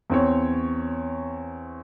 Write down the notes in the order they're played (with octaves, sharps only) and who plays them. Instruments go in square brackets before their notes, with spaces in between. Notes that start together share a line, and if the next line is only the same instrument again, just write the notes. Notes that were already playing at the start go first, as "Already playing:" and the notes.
[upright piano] E2 C4 C#5